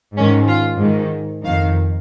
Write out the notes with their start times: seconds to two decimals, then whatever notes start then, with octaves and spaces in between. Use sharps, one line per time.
0.17 G#2 D#3 C#4
0.49 F4
0.81 G#2 D#3
1.45 F2 D#3 F5